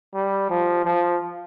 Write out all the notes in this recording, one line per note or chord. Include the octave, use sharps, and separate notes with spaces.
G3
F3
F3